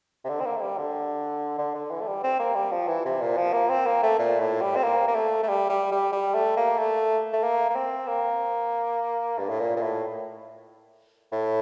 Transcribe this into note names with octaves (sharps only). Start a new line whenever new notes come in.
C3
D3
C4
A#3
A3
G3
D3
D3
D3
E3
A3
G3
C4
A#3
G3
F3
E3
C3
A#2
F3
A#3
C4
A#3
A3
A#2
A2
G3
C4
A#3
A#3
A3
A3
G3
G3
G3
G3
A3
A#3
A3
A3
A#3
A#3
C4
A#3
G2
A2
A#2
A#2
A2
A2